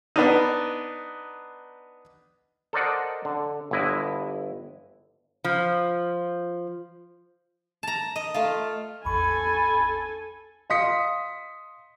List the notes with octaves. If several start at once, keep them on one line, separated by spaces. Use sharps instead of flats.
B3 D4 D#4
A4 A#4 C5 D5 D#5 F#5
D3
G1 D3 E4 D#5
F3
A5 A#5
D#5
A3 F4
A1 E2 A4 G#5 B5 C#6
D#5 F5 C6 D#6 B6 C#7